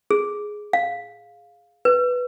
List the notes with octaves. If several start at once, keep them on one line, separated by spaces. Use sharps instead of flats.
G#4
F5
B4